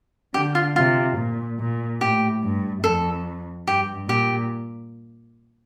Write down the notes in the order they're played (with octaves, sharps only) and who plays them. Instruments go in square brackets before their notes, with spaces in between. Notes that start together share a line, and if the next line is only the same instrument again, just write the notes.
[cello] D3 [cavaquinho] G4
[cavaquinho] F4
[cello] C3 [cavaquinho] F4
[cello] A#2
A#2
[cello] A2 [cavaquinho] G4
[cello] G2
[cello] F2 [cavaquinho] A4
[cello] G2 [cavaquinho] G4
[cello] A#2 [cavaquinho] G4